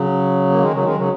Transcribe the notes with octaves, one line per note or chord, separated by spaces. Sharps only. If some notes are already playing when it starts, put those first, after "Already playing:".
Already playing: C#3 F#3
A#3
D#3 G#3
C#3 F#3
D#3 G#3
C#3 F#3